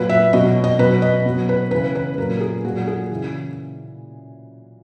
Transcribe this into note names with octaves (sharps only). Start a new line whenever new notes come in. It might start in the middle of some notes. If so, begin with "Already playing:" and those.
Already playing: A#2 F#3 B4
E5
B2 F#3 D#5
D#5
B2 F#3 B4
D#5
B2 F#3
B4
C#3 E3 B4
B4
A#2 F#3 A#4
G#4
A#2 F#3 F#4
G#4
C#3 E3